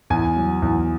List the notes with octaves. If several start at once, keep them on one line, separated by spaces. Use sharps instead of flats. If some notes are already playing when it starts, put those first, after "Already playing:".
E2 G#5
F#3
E2